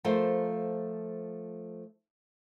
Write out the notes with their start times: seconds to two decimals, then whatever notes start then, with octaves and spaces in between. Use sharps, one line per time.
0.04 F3 A3 F4 A#4 C5